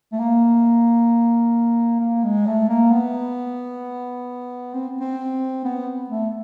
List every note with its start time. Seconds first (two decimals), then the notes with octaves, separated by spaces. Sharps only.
0.12 A3
0.19 A#3
2.00 A#3
2.24 G#3
2.46 A3
2.69 A#3
2.92 B3
4.74 C4
5.00 C4
5.65 B3
6.10 A3